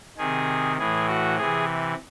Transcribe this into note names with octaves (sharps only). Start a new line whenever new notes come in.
C3 D#3 G#4
A2 E3 G#4
F#4
C3 E3 G#4